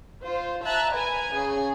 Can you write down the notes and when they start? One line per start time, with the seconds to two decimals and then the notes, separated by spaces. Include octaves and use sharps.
0.23 F4 C5
0.63 E5 A5 A#5 F#6
0.93 A#4 B4 G#5 A#5
1.31 C#3 G#4